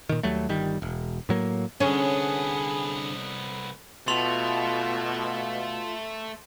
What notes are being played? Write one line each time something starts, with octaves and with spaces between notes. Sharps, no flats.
A#2 D#3
D#2 F#3 G3 A3
G1 D#3 G3
E1
A2 F#3 A#3
C2 D3 B3 C#4 G#4
B2 A3 F4 C6 F7